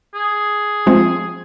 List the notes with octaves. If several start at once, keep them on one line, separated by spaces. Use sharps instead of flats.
G#4
F3 G#3 C4 F4